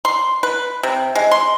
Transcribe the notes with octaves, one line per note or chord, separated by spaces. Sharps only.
C6
B4
C3
G#3
C6